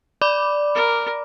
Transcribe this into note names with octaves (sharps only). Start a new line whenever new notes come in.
D5 B5 D6
A#4